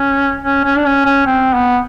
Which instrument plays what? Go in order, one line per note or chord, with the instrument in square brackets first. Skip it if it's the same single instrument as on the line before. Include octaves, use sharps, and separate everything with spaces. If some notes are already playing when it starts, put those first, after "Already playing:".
Already playing: [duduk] C#4
C#4
C#4
D4
C#4
C#4
C4
B3